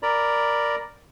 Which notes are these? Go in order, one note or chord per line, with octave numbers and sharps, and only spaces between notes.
A#4 D5 A#5 B5